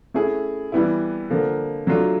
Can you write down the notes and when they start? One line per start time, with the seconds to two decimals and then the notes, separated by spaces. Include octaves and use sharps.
0.14 A3 C#4 E4 G#4
0.72 E3 G3 B3 E4
1.30 D3 F3 A#3
1.87 F#3 A3 D4 F4